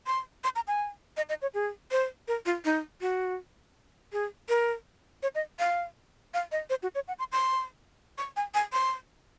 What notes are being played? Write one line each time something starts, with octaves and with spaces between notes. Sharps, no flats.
C6
C6
A#5
G#5
D#5
D#5
C#5
G#4
C5
A#4
F4
D#4
F#4
G#4
A#4
C#5
D#5
F5
F5
D#5
C5
F#4
C#5
F#5
C6
C6
C#6
G#5
G#5
C6